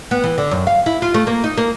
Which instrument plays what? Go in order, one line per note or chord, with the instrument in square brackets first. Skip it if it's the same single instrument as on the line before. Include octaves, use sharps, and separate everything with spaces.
[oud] B3
E3
D3
F#2
F5
E4
F4
A3
A#3
D#4
A#3